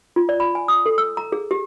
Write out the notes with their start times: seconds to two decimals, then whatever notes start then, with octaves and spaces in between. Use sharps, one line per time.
0.16 F4
0.29 D5
0.40 B5
0.55 G#5
0.68 D#6
0.86 A4
0.98 E6
1.17 A#5
1.32 G#4
1.51 G4